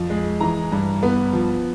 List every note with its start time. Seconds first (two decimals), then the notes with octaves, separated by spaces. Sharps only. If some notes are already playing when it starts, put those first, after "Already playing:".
Already playing: F2
0.10 G#3
0.41 E3 A#5
0.72 G2
1.03 B3
1.33 F3